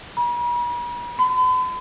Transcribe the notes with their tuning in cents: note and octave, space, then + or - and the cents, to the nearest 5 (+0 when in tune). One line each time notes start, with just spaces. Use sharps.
B5 -45
B5 +45